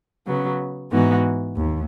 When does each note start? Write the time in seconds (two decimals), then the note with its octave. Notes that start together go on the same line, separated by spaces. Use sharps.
0.27 C#3 F#3 B3
0.91 G#2 E3 B3 D#4 F#4
1.57 D#2